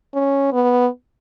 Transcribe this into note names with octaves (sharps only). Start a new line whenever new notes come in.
C#4
B3